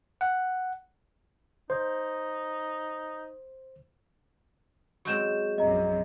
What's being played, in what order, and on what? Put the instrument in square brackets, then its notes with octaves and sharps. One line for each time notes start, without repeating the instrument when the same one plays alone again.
[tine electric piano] F#5
[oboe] D#4 [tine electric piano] C5
[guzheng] F#3 G#3 C4 [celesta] C#6 G6 E7
[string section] A#1 F#2 C3 [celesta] D#5 A#5